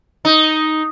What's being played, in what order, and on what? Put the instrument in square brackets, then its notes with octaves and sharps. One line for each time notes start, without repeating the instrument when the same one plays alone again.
[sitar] D#4